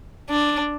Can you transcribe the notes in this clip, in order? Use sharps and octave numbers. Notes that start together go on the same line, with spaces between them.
D4